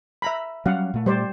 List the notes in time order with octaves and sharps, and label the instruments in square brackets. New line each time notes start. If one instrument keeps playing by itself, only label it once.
[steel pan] E5 A#5 B5
[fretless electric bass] F#3 G3 C#4 [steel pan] F5 F#5
[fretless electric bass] A#2 A3
[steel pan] G3 C5 D5